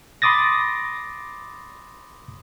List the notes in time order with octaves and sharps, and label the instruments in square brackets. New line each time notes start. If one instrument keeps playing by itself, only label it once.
[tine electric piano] B5 C6 D6 D#6 A6 A#6